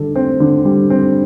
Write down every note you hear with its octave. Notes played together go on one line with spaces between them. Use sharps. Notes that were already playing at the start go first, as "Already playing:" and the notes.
Already playing: D3 G3 A4
C4
D3
G3
C4